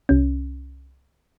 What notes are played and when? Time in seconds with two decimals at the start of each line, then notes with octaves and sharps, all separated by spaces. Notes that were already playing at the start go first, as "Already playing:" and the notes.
0.09 C2 C#4